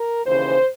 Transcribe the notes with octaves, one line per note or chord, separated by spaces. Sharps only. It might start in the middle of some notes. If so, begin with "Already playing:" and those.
Already playing: A#4
D#2 C#3 E3 C5